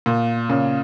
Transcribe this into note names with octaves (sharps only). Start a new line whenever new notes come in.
A#2
A#2 C#3